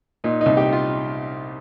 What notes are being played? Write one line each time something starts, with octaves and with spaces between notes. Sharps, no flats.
A#2 D#4
D#4
C2
G4
F4